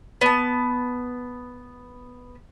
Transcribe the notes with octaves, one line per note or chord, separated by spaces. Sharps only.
B3 A5